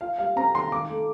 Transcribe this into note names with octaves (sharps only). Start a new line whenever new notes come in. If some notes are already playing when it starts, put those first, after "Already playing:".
F4 F5
G3 F5
C4 A#5
D#3 C6
D#3 D6
A3